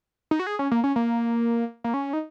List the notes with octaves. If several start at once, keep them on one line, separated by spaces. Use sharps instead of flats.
D#4
F#4
G#4
C#4
A#3
C#4
A#3
A#3
C#4
D#4